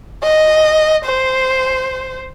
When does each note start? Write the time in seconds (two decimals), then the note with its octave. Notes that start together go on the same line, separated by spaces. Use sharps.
0.23 D#5
1.05 C5